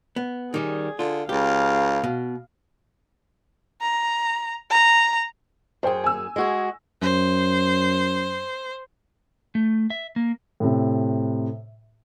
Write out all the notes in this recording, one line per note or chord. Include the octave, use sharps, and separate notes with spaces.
B3
D#3 G3 C#4 G#4
D3 F4
C#2 G4 F5
B2
A#5
A#5
F#2 G#4 C5 G5
G#5 E6
G#3 F#4 G#4
F#2 C5
A3
E5
A#3
A2 C3